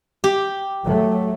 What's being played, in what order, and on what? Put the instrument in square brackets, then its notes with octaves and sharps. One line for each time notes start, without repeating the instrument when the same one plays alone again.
[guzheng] G4
[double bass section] F#3 A3